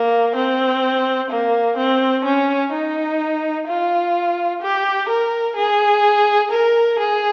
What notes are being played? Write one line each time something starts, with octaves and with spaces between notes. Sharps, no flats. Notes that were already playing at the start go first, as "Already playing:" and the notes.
Already playing: A#3
C4
A#3
C4
C#4
D#4
F4
G4
A#4
G#4
A#4
G#4